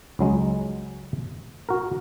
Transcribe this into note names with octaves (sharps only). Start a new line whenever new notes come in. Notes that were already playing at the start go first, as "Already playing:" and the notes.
C#2 F#3 G#3
F#4 A#4